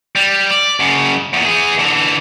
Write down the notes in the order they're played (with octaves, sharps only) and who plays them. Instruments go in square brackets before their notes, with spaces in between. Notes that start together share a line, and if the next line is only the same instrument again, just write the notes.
[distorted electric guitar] G3
D5
F#2 C#3
E2 A#2
E3 G#4
D3 E3